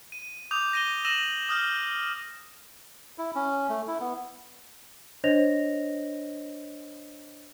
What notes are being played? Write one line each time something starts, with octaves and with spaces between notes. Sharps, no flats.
D#7
D6 D#6 G6 F7
A#6 D#7 G7
E6 A#6 D#7 E7 F#7
D#6 F6 G6
E4
C#4
A3
E4
B3
D4 C5 C#5 D#5 A#6 F7